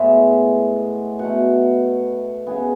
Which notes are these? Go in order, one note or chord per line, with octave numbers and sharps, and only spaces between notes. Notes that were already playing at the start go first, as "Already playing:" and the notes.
Already playing: A2 G#3 B3 E5
B2 F#5
A3
C#3 G#3 B3 G#5